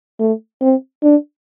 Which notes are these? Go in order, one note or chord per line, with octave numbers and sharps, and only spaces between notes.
A3
C4
D4